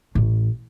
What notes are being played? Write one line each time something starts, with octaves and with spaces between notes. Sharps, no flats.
A1